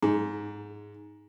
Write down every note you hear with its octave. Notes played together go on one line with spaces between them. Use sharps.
G#2